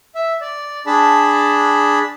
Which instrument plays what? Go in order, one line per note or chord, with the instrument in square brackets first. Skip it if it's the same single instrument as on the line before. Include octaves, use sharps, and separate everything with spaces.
[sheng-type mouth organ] E5
D5
D4 G#4 A5 B5